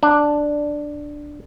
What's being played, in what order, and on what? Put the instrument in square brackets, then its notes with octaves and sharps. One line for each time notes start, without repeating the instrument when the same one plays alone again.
[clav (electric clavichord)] D4